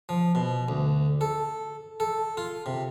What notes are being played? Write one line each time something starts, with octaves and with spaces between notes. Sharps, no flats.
F3
B2
D2
A4
A4
F4
C3